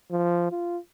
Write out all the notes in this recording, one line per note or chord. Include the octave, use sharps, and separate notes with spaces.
F3
F4